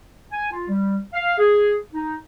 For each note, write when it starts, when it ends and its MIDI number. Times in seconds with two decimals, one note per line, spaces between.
0.32 0.50 80
0.52 0.67 65
0.69 0.99 55
1.14 1.38 77
1.39 1.75 68
1.93 2.15 63